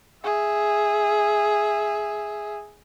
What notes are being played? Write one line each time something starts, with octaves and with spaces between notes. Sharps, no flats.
G#4 E5